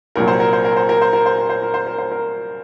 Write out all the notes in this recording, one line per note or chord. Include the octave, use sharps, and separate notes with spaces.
C2 A#2 F#3 A#4
C5
A#4
C5
A#4
C5
A#4
C5
A#4
C5
A#4
C5
A#4
C5
A#4
C5
A#4